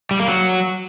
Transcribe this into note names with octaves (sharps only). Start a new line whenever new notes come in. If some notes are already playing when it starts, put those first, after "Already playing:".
G3
A#3
F#3